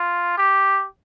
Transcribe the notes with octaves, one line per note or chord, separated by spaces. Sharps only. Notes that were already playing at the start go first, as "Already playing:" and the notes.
Already playing: F4
G4